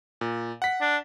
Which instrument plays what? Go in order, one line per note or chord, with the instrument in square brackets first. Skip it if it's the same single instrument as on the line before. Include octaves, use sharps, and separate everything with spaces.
[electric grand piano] A#2
F#5 B6
[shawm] D4